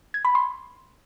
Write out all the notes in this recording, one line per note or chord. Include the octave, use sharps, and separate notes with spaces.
G#6
B5
C6